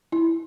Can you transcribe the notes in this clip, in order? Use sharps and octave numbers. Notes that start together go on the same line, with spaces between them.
E4